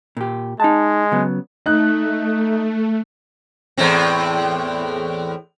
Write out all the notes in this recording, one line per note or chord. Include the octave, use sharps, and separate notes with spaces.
A#2 G4
G#3 D#4 A5
C#3 F#3 B3
A3 D#4 F#6
E2 A2 C4